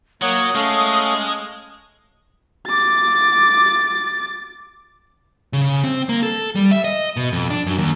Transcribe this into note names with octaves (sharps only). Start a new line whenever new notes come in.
F#3 A#3 C#5 F#5 D#6
G#3 A3 C#4 F5
D6 A6
C#3
C4
A#3
A4
G3
E5
D#5
B2
F2
D4
F#2
D#2